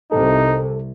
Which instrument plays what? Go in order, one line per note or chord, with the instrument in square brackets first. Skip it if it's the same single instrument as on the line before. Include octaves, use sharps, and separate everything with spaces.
[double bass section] C2 C3 [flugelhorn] D#4 [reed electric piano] A4